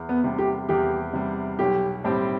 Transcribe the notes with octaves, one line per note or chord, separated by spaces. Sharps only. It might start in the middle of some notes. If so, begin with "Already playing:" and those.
Already playing: E2
B3
C3 G3
G4
E2 G4
C3 G3
B1 G4
A2 G3 C4 G4